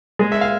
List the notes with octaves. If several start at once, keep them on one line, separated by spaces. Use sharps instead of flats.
G#3 G#4
E5
F5